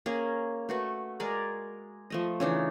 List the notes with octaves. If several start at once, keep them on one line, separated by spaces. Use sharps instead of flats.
A#3 C#4 G#4 A#4
A3 F#4 B4
G#3 G#4 A#4 D5
F3 A3 D#5
C#3 E3 D4 D#4